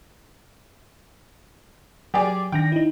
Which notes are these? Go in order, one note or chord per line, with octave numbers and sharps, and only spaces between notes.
F#3 G4 G#4 D5
D#3 D4 G5 A#6
D#4 E4